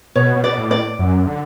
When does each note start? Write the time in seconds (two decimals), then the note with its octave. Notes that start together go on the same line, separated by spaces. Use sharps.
0.16 B2 C#5
0.36 B2
0.44 D5
0.57 A2
0.71 D5
0.99 F#2
1.27 D3